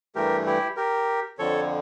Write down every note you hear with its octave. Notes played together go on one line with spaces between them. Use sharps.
G2 E3 A3 G4 A#4
E4 G4
G4 A#4
F2 D3 F3 A4 C#5